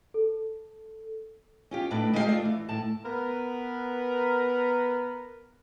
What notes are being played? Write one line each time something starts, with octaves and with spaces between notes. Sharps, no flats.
A4
C#4 F4 G4
A2 D4 B4
G#3 B3 F4 G4 B4 F5
A3 D4 F4
E3
A2 A5
B3 A#4 B4